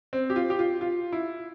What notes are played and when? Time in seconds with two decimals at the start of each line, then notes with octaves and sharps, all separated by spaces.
0.13 C4
0.30 G4
0.36 F4
0.50 G4
0.59 F4
0.81 F4
1.13 E4